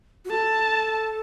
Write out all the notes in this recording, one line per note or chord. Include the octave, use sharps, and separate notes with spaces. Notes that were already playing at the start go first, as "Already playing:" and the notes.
F#4
A4 A5